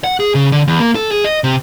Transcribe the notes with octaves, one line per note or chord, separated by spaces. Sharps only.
F#5
G#4
C#3
D3
E2
A#3
A4
G#4
D#5
C3